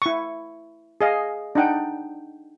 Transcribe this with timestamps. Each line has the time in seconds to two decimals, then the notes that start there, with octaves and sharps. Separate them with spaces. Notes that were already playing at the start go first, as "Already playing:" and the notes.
0.02 E4 C#6
1.01 G#4 D#5 F5
1.55 D4 D#4 F#5 G5